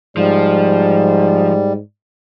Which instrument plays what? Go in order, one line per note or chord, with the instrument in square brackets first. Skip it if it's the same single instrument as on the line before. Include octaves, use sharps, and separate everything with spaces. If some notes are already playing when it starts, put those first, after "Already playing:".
[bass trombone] G#2 [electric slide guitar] F3 [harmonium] G3